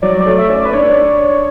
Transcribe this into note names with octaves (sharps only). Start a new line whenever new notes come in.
F#3 D5
D5
A3
E5
C#4
D5
B4
D4 C#5